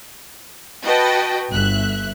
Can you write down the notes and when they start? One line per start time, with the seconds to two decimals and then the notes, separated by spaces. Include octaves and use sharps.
0.83 F#4 B4 D#5 G5 A5
1.51 G1 E5 F#6